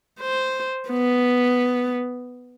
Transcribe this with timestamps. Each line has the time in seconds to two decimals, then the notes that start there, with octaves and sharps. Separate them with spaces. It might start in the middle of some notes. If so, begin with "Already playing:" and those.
0.20 C5
0.90 B3